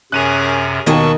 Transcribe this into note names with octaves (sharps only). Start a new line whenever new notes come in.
F#2 C3 C#4 G#4 A#4 F#6 D#7 F7
D#2 B2 D#3 A#3 D#5 G#5 A5 C#6